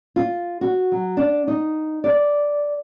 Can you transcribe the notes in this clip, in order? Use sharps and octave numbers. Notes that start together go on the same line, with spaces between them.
F4
F#4
F#3
D4
D#4
D5